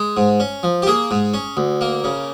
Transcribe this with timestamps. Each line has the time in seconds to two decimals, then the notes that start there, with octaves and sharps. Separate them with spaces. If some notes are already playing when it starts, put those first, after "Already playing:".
Already playing: G#3
0.17 G#2
0.40 C#4
0.63 F3
0.82 G4
0.86 A#3 G#4
1.11 G#2
1.34 C#4
1.57 D2
1.81 A#3
2.04 C#3